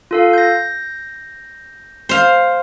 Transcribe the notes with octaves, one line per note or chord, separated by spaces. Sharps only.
F4 A4 F5
G6 A#6
C5 F5